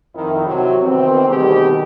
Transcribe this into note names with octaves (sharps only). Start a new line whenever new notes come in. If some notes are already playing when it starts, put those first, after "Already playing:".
F2 D#3 E4
C3 F#3
D#3 E3 B3 C4
D2 B2 D#3 G3 G4 G#4